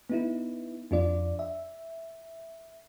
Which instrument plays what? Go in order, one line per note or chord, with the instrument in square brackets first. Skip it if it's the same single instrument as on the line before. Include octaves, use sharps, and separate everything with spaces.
[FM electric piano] B3 D#4 E4
F2 D4 F4 D5
E5